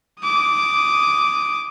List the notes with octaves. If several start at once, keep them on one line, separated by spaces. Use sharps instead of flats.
D6 D#6